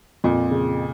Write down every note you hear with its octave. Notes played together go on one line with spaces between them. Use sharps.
F2 A#2
C#3